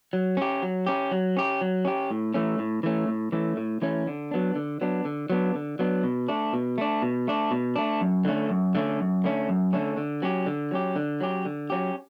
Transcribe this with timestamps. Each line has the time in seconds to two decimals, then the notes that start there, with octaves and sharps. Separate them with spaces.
0.13 F#3
0.37 C#4 G4
0.63 F#3
0.87 C#4 G4
1.11 F#3
1.37 C#4 G4
1.61 F#3
1.85 C#4 G4
2.11 A2
2.34 E3 A3 C#4
2.59 A2
2.83 E3 A3 C#4
3.08 A2
3.32 E3 A3 C#4
3.57 A2
3.82 E3 A3 C#4
4.07 D3
4.31 F#3 B3 D4
4.56 D3
4.81 F#3 B3 D4
5.05 D3
5.30 F#3 B3 D4
5.55 D3
5.79 F#3 B3 D4
6.04 B2
6.28 A3 D4
6.53 B2
6.78 A3 D4
7.02 B2
7.28 A3 D4
7.51 B2
7.76 A3 D4
8.01 F#2
8.25 D3 A3 C#4
8.50 F#2
8.75 D3 A3 C#4
9.00 F#2
9.24 D3 A3 C#4
9.49 F#2
9.73 D3 A3 C#4
9.97 D3
10.22 F#3 C#4 G4
10.46 D3
10.71 F#3 C#4 G4
10.96 D3
11.21 F#3 C#4 G4
11.45 D3
11.70 F#3 C#4 G4